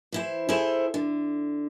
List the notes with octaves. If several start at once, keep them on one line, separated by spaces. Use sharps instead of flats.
E3 E4 C5
E4 G#4 A4 C5 E5
D3